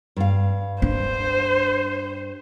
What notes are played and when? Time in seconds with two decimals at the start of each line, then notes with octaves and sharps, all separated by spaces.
0.16 G2 F5
0.82 D4 C5